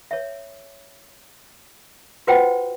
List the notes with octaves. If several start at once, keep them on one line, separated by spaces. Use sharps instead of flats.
C#5 E5
F4 F#4 B4 C5 F#5 G5